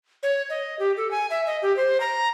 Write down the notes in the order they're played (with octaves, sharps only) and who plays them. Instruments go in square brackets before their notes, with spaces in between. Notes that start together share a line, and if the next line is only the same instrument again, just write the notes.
[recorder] C#5
D#5
G4
A4
G#5
E5
D#5
G4
C5
A#5